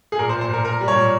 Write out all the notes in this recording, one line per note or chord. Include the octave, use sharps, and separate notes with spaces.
G#4
A#2 A#4
C5
A#2
C5
A#2 A#4
A#2 A#4
G3
C#5
A#2